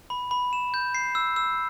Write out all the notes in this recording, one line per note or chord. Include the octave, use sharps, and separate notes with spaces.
B5
B5
E7
G6
C7
E6
E6